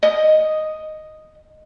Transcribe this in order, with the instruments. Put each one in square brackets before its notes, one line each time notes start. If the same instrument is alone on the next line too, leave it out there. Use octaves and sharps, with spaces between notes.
[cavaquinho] D#5 D#6